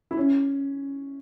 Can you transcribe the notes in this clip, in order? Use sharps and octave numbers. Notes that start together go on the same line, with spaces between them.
E4
C#4